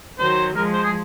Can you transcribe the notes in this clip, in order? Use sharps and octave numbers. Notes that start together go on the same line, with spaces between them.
D#3 F#3 C5
F3 G#3 A#4
C5
G#4